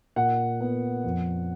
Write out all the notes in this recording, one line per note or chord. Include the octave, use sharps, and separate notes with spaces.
A#2 F#5
B3
F2